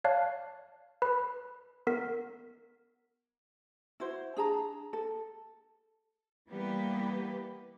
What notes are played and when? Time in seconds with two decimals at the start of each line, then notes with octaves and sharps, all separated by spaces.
0.04 C#5 D5 F5 A5 F#6
1.02 B4 B5
1.87 B3 A#4 B6
4.00 E4 F#4 C5
4.36 D4 G#4 A5 A#5
4.93 A4
6.49 E3 G3 A#3 B3 G4 B4